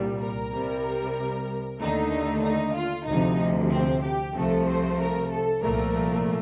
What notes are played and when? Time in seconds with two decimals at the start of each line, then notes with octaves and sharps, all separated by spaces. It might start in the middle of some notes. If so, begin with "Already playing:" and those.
Already playing: C2 A#2 G3
0.21 A#4
0.53 C2 C3 G3
1.80 D#2 D3 A3 D#4
2.44 D#4
2.75 F4
3.07 D2 C3 F3 D#4
3.72 C4
4.04 G4
4.36 C2 C3 F3 A3 A4
4.67 C5
5.00 A#4
5.31 A4
5.62 C2 A#2 F3 A3 A#4